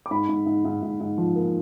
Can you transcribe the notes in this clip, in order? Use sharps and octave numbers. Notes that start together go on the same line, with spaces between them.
D6
G#2 B5
G#2
G#2
G#2
G#2
G#2
F3
A#3